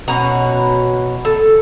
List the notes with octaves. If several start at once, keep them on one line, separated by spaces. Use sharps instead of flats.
B2 C#4 F#4 A#5
A4